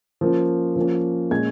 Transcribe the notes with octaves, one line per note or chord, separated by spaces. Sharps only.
F3 A#3 C#4
F3 A#3 C#4
A#2 G#3 C#4 G#6